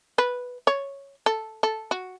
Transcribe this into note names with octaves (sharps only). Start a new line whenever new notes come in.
B4
C#5
A4
A4
F#4